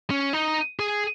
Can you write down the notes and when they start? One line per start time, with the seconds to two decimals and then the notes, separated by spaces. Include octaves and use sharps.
0.10 C#4
0.33 D#4
0.79 G#4